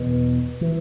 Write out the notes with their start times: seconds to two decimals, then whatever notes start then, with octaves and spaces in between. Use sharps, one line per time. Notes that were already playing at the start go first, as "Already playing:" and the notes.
Already playing: E2 B2
0.61 E3